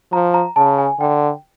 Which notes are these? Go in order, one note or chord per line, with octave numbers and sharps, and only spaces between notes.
F3 A#5
A#5
C#3 A5
G#5
D3 G5